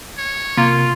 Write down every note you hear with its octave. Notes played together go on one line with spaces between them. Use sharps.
C#5
C3 A#3 F4